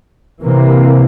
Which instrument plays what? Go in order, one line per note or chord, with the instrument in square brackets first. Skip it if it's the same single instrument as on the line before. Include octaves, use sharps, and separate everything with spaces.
[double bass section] C3 E3 A#3